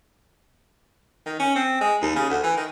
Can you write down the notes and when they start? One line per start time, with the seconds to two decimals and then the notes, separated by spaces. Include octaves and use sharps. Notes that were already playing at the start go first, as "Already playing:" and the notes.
1.26 D#3
1.40 C#4
1.56 C4
1.81 G#3
2.02 D#2
2.16 C#3
2.30 D2
2.44 E3
2.57 D#3